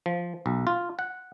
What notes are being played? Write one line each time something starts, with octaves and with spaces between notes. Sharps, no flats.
F3
B1
F4
F#5